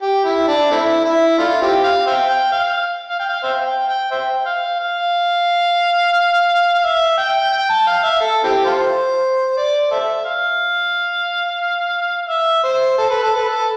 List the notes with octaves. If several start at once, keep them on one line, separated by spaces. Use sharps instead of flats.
G4
E4
D4
A3 C4 E4
E4
A3 D4 F4
C4 E4 G4
F5
C5 E5 G5
G5
F5
F5
G5
F5
C5 E5 G5
G5
G5
C5 E5 G5
F5
F5
F5
E5
G5
G5
A5
F5
E5
A4
C4 E4 G4
F4 A4 C5
D5
A4 C5 E5
F5
E5
C5
A4
B4
A4
B4
A4